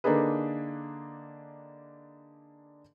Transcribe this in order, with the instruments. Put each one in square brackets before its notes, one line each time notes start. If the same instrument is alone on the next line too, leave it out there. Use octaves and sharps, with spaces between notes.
[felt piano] D3 A#3 D4 D#4 G#4 B4